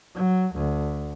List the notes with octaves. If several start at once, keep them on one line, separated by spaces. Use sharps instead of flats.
F#3
D2